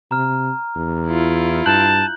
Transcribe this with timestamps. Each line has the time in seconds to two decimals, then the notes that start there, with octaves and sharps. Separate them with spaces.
0.11 C3 A#5 F6
0.76 E2
1.07 E4 F4
1.66 G2 A5 F#6 G6 F#7